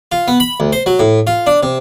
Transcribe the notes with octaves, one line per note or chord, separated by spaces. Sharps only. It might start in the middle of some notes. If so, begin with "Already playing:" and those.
F4
B3
B5
D2
C5
F#3
A2
F4
D4
C3